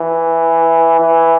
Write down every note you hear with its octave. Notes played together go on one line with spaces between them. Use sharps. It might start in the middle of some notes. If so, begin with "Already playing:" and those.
Already playing: E3
E3